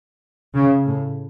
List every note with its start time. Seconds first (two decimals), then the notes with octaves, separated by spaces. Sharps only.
0.54 C#3
0.86 A2